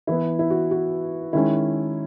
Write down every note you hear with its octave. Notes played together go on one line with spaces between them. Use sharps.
E3 B3 E4
E4
F#4
F#4
D#3 G#3 C#4 E4